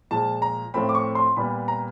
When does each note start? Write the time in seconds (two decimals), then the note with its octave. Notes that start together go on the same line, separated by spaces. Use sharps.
0.11 A#2 F3 G#3 A5
0.42 A#5
0.74 A2 F3 A3 C4 B5
0.89 D6
0.95 C#6
1.15 C6
1.37 A#2 G3 B3 B5
1.68 A#5